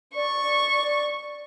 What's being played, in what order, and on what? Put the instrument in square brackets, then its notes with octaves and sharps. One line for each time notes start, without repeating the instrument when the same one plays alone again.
[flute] D5 [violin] C#6